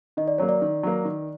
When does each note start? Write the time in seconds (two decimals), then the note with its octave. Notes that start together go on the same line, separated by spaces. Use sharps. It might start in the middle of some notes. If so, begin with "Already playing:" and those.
0.17 D#3 D#5
0.28 D5
0.38 F#3 A#3 C#5
0.49 D5
0.62 D#3
0.83 F#3 A#3
1.05 D#3